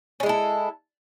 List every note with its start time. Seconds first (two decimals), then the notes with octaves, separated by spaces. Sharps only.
0.20 C#4
0.23 G#3
0.26 E4
0.29 A4